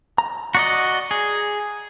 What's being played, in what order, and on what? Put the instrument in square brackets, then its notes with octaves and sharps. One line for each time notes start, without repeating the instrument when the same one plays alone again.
[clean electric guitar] A#5
[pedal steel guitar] F#4 D5 D#5
G#4